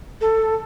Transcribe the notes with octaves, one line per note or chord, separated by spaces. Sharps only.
A4